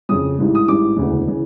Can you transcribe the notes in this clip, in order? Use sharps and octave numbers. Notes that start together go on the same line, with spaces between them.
F2 C#3 F3 D#6
A1 G#2 E3 G3
D#6
A1 G#2 E3 G3 D6
E1 D2 C#3 E3
C#3 E3